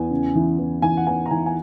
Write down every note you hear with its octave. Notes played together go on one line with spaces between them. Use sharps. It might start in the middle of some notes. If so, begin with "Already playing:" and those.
Already playing: E2 G#5
C#3
E3
E2
E3 G#5
F#5
E2 G#5
A#5
E3 G#5
G#5